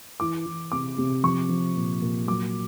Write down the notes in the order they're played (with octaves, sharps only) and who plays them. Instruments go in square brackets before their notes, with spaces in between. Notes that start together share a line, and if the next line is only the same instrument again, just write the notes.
[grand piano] E3 D6
E3
C3 D6
C3
F3 C#6
F3
A#2
A#2
F#3 D6